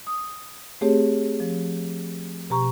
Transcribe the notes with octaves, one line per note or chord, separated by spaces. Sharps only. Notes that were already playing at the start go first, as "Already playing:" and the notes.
D#6
A3 C4 G4 G#4 C#5
F3
B2 G4 A#5 C#6